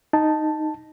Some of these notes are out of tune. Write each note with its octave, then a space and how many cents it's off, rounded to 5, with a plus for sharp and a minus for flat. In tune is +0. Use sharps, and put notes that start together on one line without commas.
D#4 +0 A5 +0